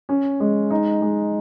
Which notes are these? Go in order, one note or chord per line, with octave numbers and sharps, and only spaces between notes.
C#4
G#3
D#4
G#3